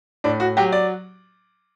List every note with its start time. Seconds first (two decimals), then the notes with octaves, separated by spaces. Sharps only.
0.24 A2 D4
0.40 F#4
0.57 F#3 G4
0.72 D5